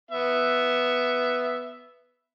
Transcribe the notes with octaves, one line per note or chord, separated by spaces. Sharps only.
B3 E5